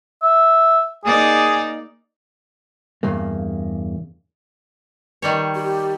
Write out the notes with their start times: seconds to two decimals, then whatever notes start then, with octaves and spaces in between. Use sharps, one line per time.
0.22 E5
1.04 A#3 D#4 G#4 D5
3.03 E2 G2 C#3 A#3
5.22 D#3 G3 C#5
5.55 G4